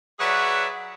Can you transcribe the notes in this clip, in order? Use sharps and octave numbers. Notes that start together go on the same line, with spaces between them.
F#3 G#4 B4 C#5 D5 E5